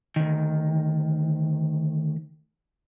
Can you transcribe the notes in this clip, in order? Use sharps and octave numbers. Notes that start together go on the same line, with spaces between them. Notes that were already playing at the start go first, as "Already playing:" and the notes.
D2 D#3